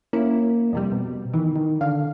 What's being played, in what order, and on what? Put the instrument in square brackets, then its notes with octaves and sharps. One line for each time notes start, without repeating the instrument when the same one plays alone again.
[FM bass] A#3 [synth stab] C#4 E4
[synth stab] F2 C3 G3
[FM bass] B2
[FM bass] D#3 [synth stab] E3
[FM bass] D#3
[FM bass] D3 [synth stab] F5